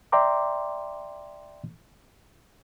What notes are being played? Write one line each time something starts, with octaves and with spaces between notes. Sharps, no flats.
D5 E5 G5 A#5 C6 D6